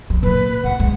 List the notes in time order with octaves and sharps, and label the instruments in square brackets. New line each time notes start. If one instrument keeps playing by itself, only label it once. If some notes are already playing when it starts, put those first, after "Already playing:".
[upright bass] F#3
[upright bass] A#2 [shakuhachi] B4
[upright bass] A2 [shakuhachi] F#5
[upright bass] G#3